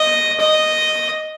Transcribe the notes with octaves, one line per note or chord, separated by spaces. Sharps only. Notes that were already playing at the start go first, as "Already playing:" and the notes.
Already playing: D#5
D#5